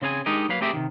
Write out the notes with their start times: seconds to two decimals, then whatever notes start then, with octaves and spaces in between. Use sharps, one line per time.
0.02 C#3 C4 G#4 F5 G#5
0.26 G#3 D4 D#4 G4 A#4 D#5
0.49 F#3 A#3 B4 F5
0.61 A3 C4 G4 G#4 A#4 E5
0.73 C3 D#3